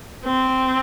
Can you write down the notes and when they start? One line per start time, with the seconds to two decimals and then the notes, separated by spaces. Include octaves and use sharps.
0.25 C4